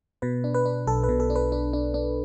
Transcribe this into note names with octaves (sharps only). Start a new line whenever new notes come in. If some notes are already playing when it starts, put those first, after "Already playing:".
B2 B4
D4
B4
D4
B1 A4
B4
B2
A4
D4
B4
D4
D4
D4